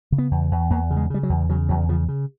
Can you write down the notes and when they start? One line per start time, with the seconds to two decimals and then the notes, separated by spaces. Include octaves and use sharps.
0.12 C#3
0.18 B3
0.31 E2
0.51 E2
0.70 E2 A#3
0.91 C#3
0.97 G#3
1.10 C#3 G3
1.23 F#3
1.30 E2
1.49 C#3 F#3
1.69 E2 F#3
1.89 C#3 F3
2.08 C#3